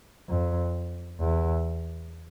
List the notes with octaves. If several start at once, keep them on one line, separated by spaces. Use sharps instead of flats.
F2
E2